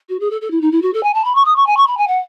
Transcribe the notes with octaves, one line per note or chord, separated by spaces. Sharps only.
F#4
G#4
A4
A4
E4
D#4
E4
F#4
A4
G#5
A5
B5
C#6
D#6
C#6
G#5
C#6
B5
G#5
F#5